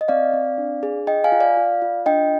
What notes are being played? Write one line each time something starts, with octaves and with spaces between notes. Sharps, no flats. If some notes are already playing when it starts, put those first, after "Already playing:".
D#5
C4 D5 F5
C4
D4
G#4
F4 D#5 G5
F5 G#5
F4
D5 F5
F4
F4
D4 D#5 G5